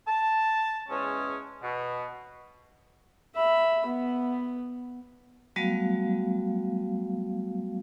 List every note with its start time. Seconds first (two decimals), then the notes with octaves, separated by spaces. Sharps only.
0.08 A5
0.89 E2 G#3 C#4
1.62 B2
3.35 E5 B5
3.86 B3
5.56 F#3 G3 A3 B3 F#4 F5